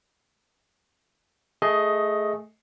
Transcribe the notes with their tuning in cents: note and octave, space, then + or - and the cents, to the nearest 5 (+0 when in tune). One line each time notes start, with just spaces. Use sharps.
A3 -5 G#4 +0 D#5 +15